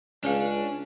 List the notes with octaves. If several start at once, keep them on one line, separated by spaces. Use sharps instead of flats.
C#2 C#4 D4 G#4 B4 F5